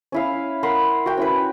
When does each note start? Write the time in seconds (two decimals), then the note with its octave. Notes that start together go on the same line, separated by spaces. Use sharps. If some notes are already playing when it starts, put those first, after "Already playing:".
0.12 C#4 E4 F5
0.63 A#4 F#5 B5 C6
1.06 F#4 G5
1.17 C#4 E4 B4